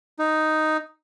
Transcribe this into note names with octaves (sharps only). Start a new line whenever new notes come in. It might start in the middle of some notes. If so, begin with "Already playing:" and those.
D#4